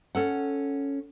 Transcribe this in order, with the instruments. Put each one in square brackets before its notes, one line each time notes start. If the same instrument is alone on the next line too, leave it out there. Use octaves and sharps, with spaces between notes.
[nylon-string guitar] C#4 A4 F#5